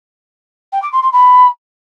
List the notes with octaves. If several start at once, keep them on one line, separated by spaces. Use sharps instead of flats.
G5
D6
C6
C6
B5